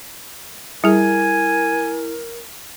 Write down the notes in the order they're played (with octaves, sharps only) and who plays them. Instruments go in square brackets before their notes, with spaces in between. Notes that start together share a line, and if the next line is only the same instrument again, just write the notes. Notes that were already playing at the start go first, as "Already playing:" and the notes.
[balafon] G3 G#4 [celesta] E4 [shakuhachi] A#4 [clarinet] G#5